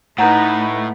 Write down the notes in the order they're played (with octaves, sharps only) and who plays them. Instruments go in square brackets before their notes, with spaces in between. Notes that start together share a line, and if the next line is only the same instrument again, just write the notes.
[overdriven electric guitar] A2 [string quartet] A3 [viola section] D#4 B4 [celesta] F#5 A#5 G6